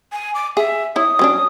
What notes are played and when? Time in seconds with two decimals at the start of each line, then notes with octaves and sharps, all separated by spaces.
0.12 G#5
0.34 D6
0.57 G#4 E5
0.96 E4 C#5 D#6
1.19 F#3 C#4 D4